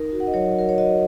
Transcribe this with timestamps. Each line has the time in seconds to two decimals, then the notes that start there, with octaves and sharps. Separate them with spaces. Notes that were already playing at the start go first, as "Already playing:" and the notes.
Already playing: D#4 A#4
0.12 F#4
0.20 F#5
0.27 D#5
0.34 F#3 C#5
0.56 F#4 A#4
0.69 C#5
0.78 F#4 D#5